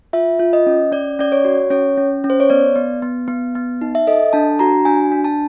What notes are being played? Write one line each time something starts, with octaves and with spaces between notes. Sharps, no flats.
F4 E5
F4
D#5
C#4
C#4 D5
C#4 D5
C#5
F#4
C#4 C#5
C#4
C#4
C5
C#5
B3 D5
B3
B3
B3
B3
D#4
E5
A4 D#5
D4 A5
F#4 A#5
D4 G#5
D4
A5